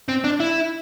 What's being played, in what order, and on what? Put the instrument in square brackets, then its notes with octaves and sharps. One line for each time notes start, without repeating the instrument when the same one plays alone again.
[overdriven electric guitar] C4
D4
E4